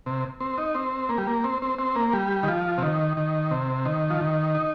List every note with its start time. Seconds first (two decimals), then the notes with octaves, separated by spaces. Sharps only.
0.06 C3
0.40 C4
0.58 D#4
0.75 C4
1.09 A#3
1.18 G3
1.27 A#3
1.44 C4
1.62 C4
1.79 C4
1.96 A#3
2.13 G3
2.43 D#3
2.48 F3
2.78 C3
2.82 D#3
3.17 D#3
3.51 C3
3.85 D#3
4.10 F3
4.21 D#3
4.55 D#4